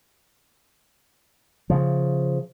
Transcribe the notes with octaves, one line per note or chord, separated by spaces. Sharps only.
C#3 F3